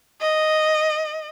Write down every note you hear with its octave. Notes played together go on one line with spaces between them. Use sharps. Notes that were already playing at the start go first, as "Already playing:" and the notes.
D#5